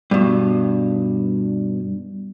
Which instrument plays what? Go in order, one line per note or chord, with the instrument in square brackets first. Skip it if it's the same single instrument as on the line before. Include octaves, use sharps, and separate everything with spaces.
[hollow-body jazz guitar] G2 B2